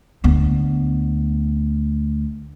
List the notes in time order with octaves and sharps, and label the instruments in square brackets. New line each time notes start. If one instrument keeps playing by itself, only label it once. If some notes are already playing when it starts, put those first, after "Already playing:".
[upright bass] D2 B3